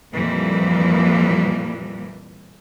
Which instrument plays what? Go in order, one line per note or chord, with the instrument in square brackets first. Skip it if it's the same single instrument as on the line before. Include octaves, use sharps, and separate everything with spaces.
[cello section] F2 A#2 E3 F3 G3 A#3